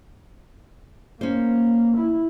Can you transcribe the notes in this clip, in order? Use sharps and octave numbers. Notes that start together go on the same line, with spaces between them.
A#3 C#4 C5
E4